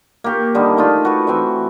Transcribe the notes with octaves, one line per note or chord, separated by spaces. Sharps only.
A#3 G4 C#6
D3 D#3 G3 D#4
A3 D#4 F4
F#4 B4
E3 C4 E4 E5